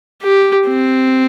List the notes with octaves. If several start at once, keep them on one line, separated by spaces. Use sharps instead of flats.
G4
C4